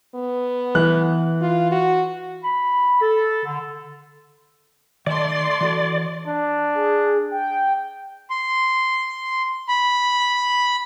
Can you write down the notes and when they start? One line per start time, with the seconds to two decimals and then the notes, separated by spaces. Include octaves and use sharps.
0.15 B3
0.75 E3 F#6
1.41 F4
1.71 F#4
2.43 B5
3.01 A4
3.45 D3
5.07 D#3 A3 D5 E5 C6
5.61 E3 F#4 A4
6.28 D4
6.74 G#4
7.31 G5
8.30 C6
9.68 B5